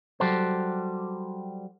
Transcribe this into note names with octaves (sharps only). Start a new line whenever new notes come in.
F#3 G3 F#4 G4 A4 C5